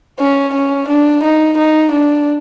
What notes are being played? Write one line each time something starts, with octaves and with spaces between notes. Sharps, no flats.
C#4
C#4
D4
D#4
D#4
D4